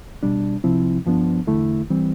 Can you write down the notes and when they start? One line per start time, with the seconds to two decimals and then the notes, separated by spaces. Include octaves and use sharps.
0.23 B2 G3 D4
0.64 C2 C3 F3 C4 E4
1.06 G2 F3 B3 D4
1.47 E2 D3 A3 E4
1.90 E3 G3 C4